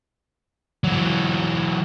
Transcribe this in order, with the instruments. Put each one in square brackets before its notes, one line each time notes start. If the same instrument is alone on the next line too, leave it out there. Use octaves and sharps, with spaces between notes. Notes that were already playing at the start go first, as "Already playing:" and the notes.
[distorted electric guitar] E3 F#3